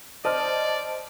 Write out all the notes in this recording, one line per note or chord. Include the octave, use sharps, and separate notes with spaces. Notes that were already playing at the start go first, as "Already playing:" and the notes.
C5 D5 D#5 A5 F6